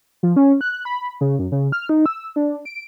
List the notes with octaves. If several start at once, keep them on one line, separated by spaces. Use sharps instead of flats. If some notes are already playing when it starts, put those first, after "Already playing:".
F3
C#4
F#6
B5
C#3
F#2
C#3
F6
D#4
E6
D4
D7